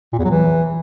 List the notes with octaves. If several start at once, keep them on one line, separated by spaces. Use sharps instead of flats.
A#2
E2
F#3
E3